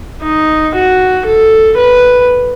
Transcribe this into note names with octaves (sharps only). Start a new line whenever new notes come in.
D#4
F#4
A4
B4